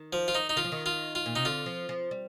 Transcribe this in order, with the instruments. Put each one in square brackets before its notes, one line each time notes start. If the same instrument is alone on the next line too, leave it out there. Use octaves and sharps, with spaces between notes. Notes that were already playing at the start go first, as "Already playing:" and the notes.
Already playing: [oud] D#3
[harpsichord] F3
F4
D#4
D#4
[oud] D#3 [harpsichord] F4
[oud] F3
D#3
[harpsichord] F4
F4
[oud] A#2
[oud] C3 [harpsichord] D#4
[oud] D3 [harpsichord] F4
[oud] F3
F3
G3